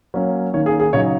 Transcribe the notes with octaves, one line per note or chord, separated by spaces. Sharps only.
F#3 A#3 C#4
D#3 A#3 C#4 C#5
G#4
G#4
C#3 F#3 D#4 C#5